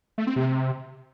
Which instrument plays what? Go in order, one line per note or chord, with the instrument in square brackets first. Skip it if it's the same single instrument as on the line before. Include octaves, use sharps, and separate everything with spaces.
[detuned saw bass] A3
C4
C3